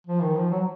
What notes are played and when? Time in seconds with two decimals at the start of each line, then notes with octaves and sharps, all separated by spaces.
0.07 F3
0.22 D#3
0.37 F3
0.51 F#3